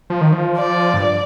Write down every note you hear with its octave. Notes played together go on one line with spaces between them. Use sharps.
F3
D#3
F3
D5
G2